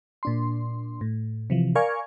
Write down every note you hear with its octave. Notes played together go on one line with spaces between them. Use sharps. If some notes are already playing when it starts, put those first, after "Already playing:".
A#2 D4 C6
A2
C3 E3 F3
A#4 D5 F5 G#5 C#6 G#6